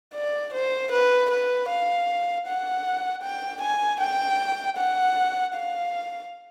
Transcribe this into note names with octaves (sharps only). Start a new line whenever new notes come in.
D5
C5
B4
B4
F5
F#5
G5
G#5
G5
F#5
F5